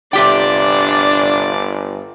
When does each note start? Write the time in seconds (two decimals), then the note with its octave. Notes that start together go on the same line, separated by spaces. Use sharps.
0.13 G1 C3 D4 G4 D5 G5